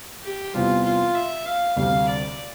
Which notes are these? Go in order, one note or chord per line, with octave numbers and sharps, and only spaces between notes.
G4
E2 C3 G3 C4 F4
F4
E5
F5
D2 C3 G3 C4 G4 F5
D5